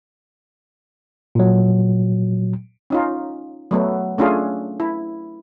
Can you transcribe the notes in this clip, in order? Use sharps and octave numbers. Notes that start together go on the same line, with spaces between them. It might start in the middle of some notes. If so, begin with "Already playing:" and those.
A#2 F#3
C#4 D#4 F4
F#3 A3 B3
A3 C#4 D4 F4 G#4
E4